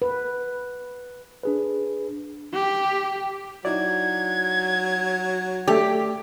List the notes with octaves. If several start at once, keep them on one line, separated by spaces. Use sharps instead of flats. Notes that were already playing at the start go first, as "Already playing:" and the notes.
B4
D4 G#4 B4
G4
F#3 D#4 E4 D5 G#6
A3 G4 A4 D5